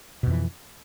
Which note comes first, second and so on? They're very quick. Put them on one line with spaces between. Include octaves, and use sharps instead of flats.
B2 F2 E3